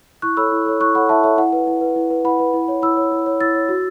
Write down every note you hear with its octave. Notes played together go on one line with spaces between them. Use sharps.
E4 C#6 F#6
A4 C#5 B5 E6
E4
A4 C#5
E4 C#6 F#6
A4 C#5 F#5 B5
E4 E5 A5
A4 C#5 E5
E4 F#5
B4
E4
B4
E4
B4
E4 F#5 B5
B4
E4
C#5
E4 B5 E6
C#5
E4
C#5
E4 E6 A6
C#5
F#4